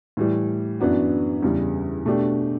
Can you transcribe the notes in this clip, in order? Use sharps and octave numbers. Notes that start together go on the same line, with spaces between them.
A2 E3 G3
F#2 E3 B3 D4 F#4
E2 C#3 G3
B2 A3 D4 G4